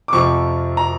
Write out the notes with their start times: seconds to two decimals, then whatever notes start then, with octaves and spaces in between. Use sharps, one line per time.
0.08 D6
0.13 F2 C3 F3 C#6
0.77 A#5